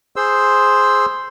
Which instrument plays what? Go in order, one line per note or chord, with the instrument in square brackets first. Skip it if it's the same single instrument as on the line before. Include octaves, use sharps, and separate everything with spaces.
[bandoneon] G#4 C5 C6 E6